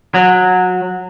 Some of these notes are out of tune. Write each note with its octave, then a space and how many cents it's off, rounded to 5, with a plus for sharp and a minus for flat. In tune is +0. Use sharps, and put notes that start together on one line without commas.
F#3 -20